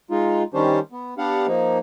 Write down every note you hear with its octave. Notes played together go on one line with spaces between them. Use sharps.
G#3 D#4 F4
D#3 G3 C#4 D4 G4 C5
B3
B3 D4 G4 F5 F#5
F3 A#3 D#4